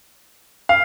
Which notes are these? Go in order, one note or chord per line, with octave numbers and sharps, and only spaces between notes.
F5